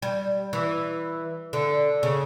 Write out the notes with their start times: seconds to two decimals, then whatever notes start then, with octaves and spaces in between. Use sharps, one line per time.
0.02 G3
0.53 E3
1.53 D3
2.03 C#3